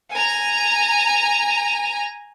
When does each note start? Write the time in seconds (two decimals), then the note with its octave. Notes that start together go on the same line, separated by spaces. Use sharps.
0.12 G#5 A#5